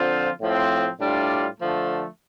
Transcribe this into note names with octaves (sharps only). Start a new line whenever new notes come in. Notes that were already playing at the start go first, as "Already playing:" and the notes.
Already playing: D3 F3 C4 F4
A2 F3 C4
A2 G3 D4 F4
D3 F3 A3